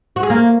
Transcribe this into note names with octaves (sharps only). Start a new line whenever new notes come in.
F#4
G#4
A#3